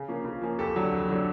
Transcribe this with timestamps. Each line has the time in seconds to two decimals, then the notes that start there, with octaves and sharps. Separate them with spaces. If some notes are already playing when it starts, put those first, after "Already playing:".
Already playing: C#3
0.08 F3 A#3 C#4
0.25 C#3
0.41 F3 A#3 C#4
0.59 F2 G4 A4
0.76 D3 F#3
0.93 F2
1.08 D3 F#3